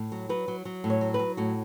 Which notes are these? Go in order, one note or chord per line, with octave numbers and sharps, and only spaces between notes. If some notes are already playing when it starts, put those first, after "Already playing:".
Already playing: A2
F#3
F#3 B4
F#3
F#3
A2
C#5
F#3
B4
F#3
A2 F#4